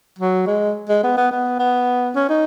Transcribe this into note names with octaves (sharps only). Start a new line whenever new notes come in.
F#3
G#3
G#3
B3
B3
B3
B3
C#4
D#4